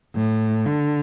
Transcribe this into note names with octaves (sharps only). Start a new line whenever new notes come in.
A2
D3